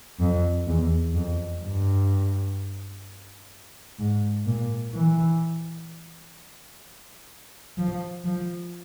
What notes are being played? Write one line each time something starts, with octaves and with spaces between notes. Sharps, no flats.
F2
E2
F2
G2
G#2
A#2
E3
F3
F3